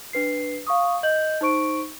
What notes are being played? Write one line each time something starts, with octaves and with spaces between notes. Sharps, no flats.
D4 B4 C7
F5 C#6 D#6
D#5 G6 F#7
D#4 C5 C#6 D7